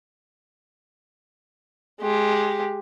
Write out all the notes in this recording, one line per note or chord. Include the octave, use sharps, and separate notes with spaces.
G#3 G4